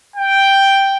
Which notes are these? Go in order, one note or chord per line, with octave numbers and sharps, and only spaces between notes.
G5